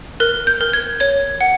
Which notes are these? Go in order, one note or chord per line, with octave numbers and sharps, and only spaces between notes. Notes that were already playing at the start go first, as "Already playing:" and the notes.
A#4 F#6
G6
A#4
G#6
C#5 G#6
F#5